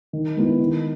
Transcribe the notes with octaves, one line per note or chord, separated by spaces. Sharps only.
D#3
G#3 B3 E4
D#3